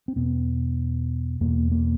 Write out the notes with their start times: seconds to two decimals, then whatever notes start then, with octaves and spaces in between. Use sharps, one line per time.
0.08 C4
0.16 E2 B2 B3
1.40 E2 B2 A#3
1.72 A#3